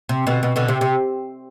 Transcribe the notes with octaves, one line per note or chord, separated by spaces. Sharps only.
C3
B2 D3
B2
B2 D3
C3
C3